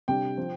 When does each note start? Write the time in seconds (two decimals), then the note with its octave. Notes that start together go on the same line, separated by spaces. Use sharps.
0.08 C3 G3 D4 G5
0.38 F3 C4